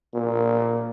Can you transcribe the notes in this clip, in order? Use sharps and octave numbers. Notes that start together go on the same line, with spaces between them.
A#2